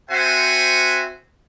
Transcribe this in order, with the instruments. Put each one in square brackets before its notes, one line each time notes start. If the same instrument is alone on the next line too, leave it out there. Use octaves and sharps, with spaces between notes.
[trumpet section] C4 F#4 C5 E5 F#5 G#5